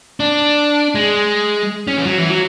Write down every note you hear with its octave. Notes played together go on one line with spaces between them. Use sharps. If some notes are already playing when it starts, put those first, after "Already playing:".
D4
G#3
C#4
E3
F#3
E3
F#3